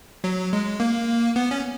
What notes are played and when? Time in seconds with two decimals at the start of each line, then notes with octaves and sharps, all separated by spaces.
0.24 F#3
0.53 G#3
0.80 A#3
1.36 B3
1.51 C#4